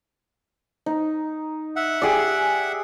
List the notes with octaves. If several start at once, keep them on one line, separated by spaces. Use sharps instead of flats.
D#4
E5 F#5
G4 G#4 D5